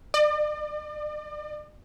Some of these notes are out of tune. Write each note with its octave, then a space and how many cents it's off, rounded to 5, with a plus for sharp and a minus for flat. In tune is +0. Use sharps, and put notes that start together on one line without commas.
D5 +40